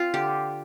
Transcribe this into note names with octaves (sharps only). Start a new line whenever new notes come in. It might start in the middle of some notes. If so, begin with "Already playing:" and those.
Already playing: C4 F4
D3 G4